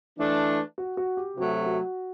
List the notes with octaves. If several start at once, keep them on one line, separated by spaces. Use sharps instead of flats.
E3 A3 D4
F#4
F#4
G4
C3 F#3 A3 F#4
F#4